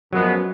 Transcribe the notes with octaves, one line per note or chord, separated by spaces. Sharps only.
F#2 F3 F#3 G#3 B3